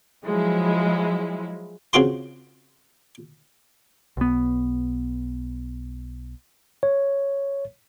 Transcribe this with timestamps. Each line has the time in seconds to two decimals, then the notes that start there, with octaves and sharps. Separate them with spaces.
0.24 F3 F#3 G#3 E4
1.93 C#3 C4 F4 F#4 G5 C6
4.17 B1 B3
6.83 C#5